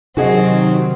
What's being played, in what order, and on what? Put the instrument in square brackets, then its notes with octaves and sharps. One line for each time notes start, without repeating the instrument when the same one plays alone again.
[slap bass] C3 [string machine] D#3 F#3 [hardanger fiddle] C4 [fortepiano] F#4 G#4 D#5